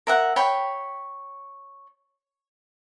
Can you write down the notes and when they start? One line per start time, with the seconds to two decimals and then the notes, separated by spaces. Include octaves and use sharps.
0.07 A#4 E5 F#5
0.36 C#5 G5 B5